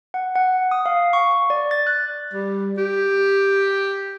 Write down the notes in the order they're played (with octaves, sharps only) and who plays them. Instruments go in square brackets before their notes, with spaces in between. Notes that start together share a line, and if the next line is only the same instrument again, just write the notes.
[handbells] F#5
F#5
D#6
F5
C#6
D5
A6
F#6
[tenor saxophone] G3
G4